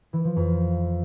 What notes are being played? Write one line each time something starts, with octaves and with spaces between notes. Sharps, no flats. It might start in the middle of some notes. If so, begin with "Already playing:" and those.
E3
F3
F2